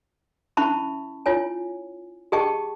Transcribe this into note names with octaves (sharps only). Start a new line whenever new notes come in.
C#4 E4 E5 A5 B5 C#6
E4 F4 C#5 G#5
G4 G#4 D#5 G5 A5 C#6